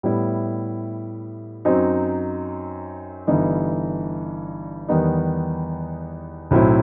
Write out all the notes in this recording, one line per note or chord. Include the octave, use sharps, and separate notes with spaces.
A2 G3 B3 E4
F#2 F#3 C4 D#4
G1 G2 E3 B3 D#4
E2 D#3 G3 B3 D#4
B1 A2 F#3 C4 E4